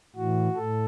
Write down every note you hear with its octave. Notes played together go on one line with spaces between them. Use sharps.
A2 E3 F#4
A2 A4